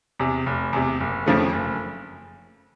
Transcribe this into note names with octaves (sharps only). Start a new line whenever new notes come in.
E2 C3
F1
E2 C3
F#1
F2 C#3 F3 A3
F#1